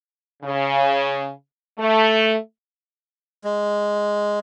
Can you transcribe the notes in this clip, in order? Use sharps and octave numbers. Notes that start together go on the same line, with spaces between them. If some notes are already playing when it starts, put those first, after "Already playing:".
C#3
A3
G#3